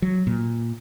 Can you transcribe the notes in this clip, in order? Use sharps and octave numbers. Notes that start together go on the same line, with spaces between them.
F#3
A#2